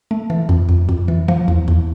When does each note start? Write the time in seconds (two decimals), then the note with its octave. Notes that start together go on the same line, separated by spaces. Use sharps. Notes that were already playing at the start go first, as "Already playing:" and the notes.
0.11 A3
0.30 E3
0.49 F2
0.69 F2
0.89 F2
1.08 E3
1.28 F3
1.48 E2
1.68 E2